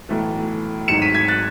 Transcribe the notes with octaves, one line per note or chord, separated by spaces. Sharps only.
B1 A2 E3 A3
G#1 G#2 D#3 F#3 C#7 E7
B6 D#7
G#6 B6
F#6 A6